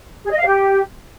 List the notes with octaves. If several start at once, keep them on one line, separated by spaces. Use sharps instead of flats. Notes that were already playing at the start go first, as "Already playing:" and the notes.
G#4
D#5
F5
G4